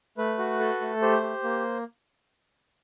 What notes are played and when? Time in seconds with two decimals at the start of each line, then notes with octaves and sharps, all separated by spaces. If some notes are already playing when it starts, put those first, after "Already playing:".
0.18 A3 B4
0.38 F#4
0.60 A4
0.81 A3
1.02 G4 C5
1.23 G4
1.43 A#3